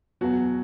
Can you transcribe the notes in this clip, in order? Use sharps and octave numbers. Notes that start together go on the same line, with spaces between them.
E2 B2 F#3 F#4